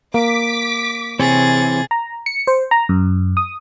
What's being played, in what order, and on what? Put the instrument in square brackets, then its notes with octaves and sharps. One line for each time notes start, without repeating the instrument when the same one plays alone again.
[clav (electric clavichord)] A#3 [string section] D6 B6
[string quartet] C3 G#4 A6 [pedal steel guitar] E3 C4 C#5
[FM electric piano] A#5
C#7
C5
A#5
F#2
D#6